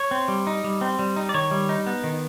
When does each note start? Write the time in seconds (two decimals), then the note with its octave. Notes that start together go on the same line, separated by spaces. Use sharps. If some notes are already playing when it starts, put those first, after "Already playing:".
Already playing: C#5
0.11 C4
0.28 G3
0.47 D#4
0.64 G3
0.81 C4
0.99 G3
1.16 D#4
1.29 D5
1.34 D#3 C#5
1.51 G3
1.69 D#4
1.87 B3
2.04 D#3